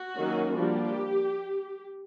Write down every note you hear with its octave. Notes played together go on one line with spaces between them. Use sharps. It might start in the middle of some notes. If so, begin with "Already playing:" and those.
Already playing: F#4
D#3 F#3 A#3 C#4
F3 G3 A#3 D4 G4